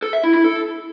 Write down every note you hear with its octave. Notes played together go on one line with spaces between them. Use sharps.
A4
E5
E4
E4
A4